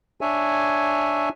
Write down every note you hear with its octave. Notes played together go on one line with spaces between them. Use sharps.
D4 C#5 E5 G#5